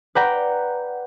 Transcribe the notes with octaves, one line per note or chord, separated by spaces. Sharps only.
B4 D5 F#5 G5 A#5 B5